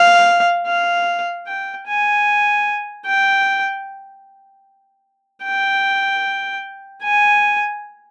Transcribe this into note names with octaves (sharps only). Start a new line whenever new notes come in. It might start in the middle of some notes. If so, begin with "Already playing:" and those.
Already playing: F5
F5
G5
G#5
G5
G5
G#5